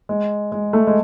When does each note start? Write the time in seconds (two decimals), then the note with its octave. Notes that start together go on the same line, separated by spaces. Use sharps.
0.09 G#3
0.52 G#3
0.73 A3
0.87 G#3